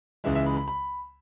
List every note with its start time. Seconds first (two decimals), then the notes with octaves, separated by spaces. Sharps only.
0.24 C#2 C#3 E3 G#3 E5
0.35 E5
0.46 B5
0.57 B5
0.68 B5